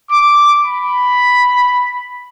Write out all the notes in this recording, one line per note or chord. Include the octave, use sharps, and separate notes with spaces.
D6
B5